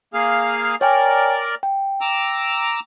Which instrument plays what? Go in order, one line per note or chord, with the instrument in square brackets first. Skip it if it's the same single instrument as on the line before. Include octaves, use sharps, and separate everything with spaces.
[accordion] A#3 G#4 F5
[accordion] A#4 D5 [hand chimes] C#5 G5 G#5
[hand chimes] G5
[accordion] A#5 D6 E6